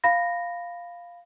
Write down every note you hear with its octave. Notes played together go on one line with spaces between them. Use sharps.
F5 B5 A#6